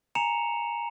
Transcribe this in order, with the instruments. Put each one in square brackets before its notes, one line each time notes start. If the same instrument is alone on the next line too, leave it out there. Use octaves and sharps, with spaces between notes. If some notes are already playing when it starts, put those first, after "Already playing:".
[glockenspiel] G#5 A#5 C#7 E7 F7